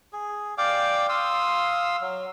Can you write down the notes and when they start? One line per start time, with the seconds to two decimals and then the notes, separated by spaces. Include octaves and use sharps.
0.13 G#4
0.58 D5 F5 G5 D6
1.09 F5 C6 D#6 E6
2.01 F#3